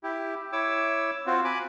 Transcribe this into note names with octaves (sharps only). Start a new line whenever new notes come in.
E4 G4
E4 C#5 D6 E6
C4 F4 F#4
G#5 B5 D6 F#6